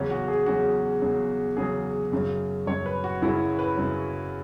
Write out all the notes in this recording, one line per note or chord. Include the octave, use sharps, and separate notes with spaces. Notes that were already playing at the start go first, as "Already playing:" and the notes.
Already playing: E2 C#3 F#3 C#4
F#4
G#4
E2 C#3 F#3 F#4
E2 C#3 F#3
E2 C#3 F#3 G#4
F#2 C#3 F#3
F#2 C#3 F#3 C#5
B4
F#4
F#2 C#3 F#3 E4
B4
F#2 C#3 F#3